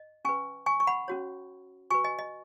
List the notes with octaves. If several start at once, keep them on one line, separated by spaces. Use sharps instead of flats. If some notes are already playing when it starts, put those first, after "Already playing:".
Already playing: D#5
C#4 B4 G#5 C#6
G#5 C#6
C#6
F#5 B5
C#4 F#4 C#5
F#4 B4 G#5 C#6
D#5 G#5
D#5